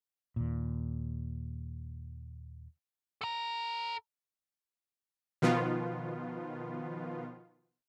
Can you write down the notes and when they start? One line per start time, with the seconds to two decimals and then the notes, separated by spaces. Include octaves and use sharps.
0.36 D#2 A#2
3.21 A4 A#5
5.42 B2 D#3 F3 B3 F4